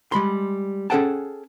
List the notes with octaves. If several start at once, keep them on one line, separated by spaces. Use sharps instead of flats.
G3 G#3 B5 C6
C#4 G#4 A4 F#5 G5 A5